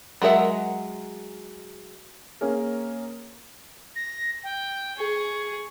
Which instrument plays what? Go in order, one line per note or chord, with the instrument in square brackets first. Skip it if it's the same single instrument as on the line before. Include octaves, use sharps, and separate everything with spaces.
[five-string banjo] F#3 G#3 A#4 E5 F#5
[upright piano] A#3 C#4 G#4 A#4
[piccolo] A#6
G5
[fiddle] G#4 [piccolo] C#6